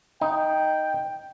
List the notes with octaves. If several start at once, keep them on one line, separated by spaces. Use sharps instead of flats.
D#4 G5